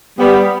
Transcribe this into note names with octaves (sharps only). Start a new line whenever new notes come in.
G3 B3